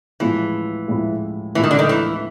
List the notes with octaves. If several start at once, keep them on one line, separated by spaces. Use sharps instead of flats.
A2 E3 F3 G#3 C#4 E4
A2 F3 G#3 C#4 E4
A2 E3 F3 G#3 C#4 E4
D#3
D3
D#3
E3